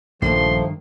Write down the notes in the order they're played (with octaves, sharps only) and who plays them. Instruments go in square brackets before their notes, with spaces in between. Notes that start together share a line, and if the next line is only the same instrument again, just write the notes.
[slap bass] A#1 [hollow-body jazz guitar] G2 D#3 A#3 [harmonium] F3 A3 [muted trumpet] C6